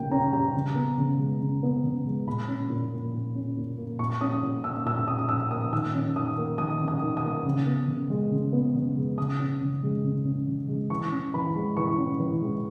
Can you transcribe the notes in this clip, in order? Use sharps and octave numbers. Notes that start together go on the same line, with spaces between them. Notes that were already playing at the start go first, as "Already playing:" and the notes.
Already playing: C#3 G3 A#3 G5
C#4 A#5
G3 A#5
C#3
B3
C#3
G#3
C#3
B3
C#3
G#3
A#2 B5
C#4
A#2
A#3
A#2
C#4
A#2
A#3
A#2 C#6
C#4 D#6
A#2
A#3 E6
A#2 E6
C#4 D#6
A#2 E6
A#3 D#6
D#3 E6
C#4
D#3 D#6
A#3
D#3 D#6
C#4
D#6
D#3
D#6
A#3
C#3
B3
C#3
G#3
C#3
B3
C#3
G#3
C#3 D#6
C#4
C#3
G#3
C#3
C#4
C#3
G#3
E3 C#6
C#4
E3 B5
G#3
E3 C#6
C#4
E3
G#3